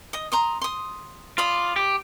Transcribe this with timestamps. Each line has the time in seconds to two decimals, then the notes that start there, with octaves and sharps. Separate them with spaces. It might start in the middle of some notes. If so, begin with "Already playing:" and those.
0.13 D#5 D#6
0.32 A#5 C6 D#6
0.61 C6 D#6
1.38 F4 D5 B5 D#6
1.76 G4